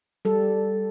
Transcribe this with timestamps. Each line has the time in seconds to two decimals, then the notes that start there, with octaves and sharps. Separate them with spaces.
0.25 G3 A4